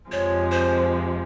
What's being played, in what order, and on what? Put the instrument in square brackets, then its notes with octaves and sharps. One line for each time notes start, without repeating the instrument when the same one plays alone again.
[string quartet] F2 C3 F3 G#3 [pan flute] C#5
[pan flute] C5